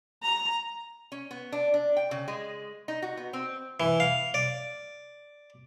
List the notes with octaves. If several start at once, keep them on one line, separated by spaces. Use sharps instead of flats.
A#5
C#4
B3
D4
D4
G5
C#3
G#3
D#4
F#4
B3
C4
E3
F5
D5